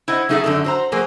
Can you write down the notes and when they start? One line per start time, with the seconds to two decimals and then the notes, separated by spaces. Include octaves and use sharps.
0.08 E4 C5 D#5 F#5
0.29 F#3 A3 D#4 G#4 A4 E5
0.44 F#2 D3 D#4 A4
0.64 F#4 C5 A#5
0.92 F#3 A#3 G#4 A#4 C5